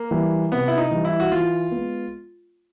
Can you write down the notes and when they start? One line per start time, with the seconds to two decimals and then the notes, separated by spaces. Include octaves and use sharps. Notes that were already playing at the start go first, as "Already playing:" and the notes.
Already playing: A#3
0.11 E3 G3
0.52 C3 B3
0.68 E4
0.78 D#4
0.91 E3 G3
1.05 E4
1.20 F#4
1.32 E3 F4
1.71 G#3 B3